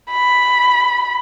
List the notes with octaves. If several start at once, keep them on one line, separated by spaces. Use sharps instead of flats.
B5